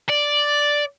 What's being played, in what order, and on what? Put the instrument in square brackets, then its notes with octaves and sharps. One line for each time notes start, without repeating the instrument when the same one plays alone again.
[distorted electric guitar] D5